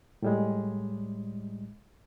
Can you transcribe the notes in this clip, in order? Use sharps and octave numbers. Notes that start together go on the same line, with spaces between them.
A2 G3 G#3